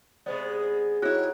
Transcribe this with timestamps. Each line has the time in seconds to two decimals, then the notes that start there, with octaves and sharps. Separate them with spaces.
0.26 C3 G#3 B3 C5 D5
1.02 G#2 E4 F#4 G4 C#5 F#6